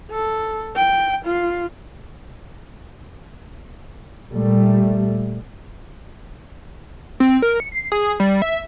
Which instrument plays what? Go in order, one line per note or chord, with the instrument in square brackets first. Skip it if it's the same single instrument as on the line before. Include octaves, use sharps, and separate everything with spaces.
[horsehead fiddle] A4
G5
F4
[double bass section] A#2 G3 A3
[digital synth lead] C4
A#4
C#7
C7
G#4
G3
E5